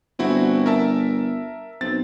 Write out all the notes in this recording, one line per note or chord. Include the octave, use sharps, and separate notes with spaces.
G1 C4 E4 F#4
A#4 E5 A5
B1 C4 A6